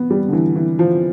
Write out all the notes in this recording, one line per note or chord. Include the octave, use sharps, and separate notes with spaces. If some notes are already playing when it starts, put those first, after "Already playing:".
Already playing: B3
G3
D3
E3
E3
F3